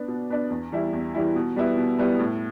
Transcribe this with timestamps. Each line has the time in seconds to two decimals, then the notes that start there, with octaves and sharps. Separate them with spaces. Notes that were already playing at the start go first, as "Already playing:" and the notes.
Already playing: B3 D4
0.08 B2
0.30 B3 D4
0.50 E2
0.72 E3 G3 E4
0.93 E2
1.14 E3 G3 E4
1.36 B2
1.56 G3 B3 E4
1.77 B2
1.99 G3 B3 E4
2.19 A2